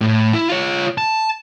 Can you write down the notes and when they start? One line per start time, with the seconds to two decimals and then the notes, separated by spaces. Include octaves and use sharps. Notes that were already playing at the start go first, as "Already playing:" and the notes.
0.01 A2
0.34 E4
0.48 F4 C#5
0.98 A5